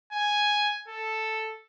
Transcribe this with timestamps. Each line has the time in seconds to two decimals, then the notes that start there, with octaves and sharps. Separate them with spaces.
0.13 G#5
0.88 A4